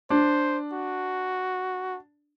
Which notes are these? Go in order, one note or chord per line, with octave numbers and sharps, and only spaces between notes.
D4 C5
F#4